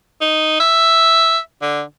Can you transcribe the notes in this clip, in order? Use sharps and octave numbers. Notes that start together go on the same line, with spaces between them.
D#4
E5
D3